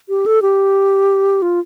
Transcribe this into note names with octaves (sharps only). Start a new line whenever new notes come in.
G4
A4
G4
F4